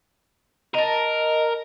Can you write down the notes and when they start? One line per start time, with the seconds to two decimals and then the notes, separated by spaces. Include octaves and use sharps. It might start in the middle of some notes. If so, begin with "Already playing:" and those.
0.74 A#4 D#5 A5